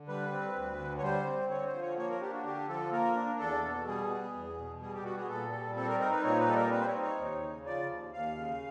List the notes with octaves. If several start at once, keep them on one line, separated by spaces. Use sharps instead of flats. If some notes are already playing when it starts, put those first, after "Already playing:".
Already playing: D3
G3 B4
C4
D2
D3
C#5
G3 C5
C4
D3 C#5
C5
F3
C#5
A#3 C#5
A#4
D4 G4
F#4
D3 G4
F3 A4
A#3 A#4
D4
E2 A4
B2
G3 G#4
B3
E2
B2
G3 G#4
G4
B3 F#4
G#4
A#2 A4
G3
C4 A4
A#4
D#4 A#4
B4
A#2 C#5
B4
G3 A4
A#4
C4 B4
C5
C#5
D#4
C#5
D#2
C#3
F3 D5
D#2
D#2 F5
C#3